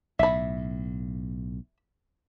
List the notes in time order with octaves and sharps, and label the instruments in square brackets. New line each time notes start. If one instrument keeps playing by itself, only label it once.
[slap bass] B1 A2 [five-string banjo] E5 B5